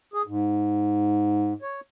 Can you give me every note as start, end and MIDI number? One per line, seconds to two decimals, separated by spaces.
0.14 0.22 68
0.27 1.53 44
1.62 1.80 73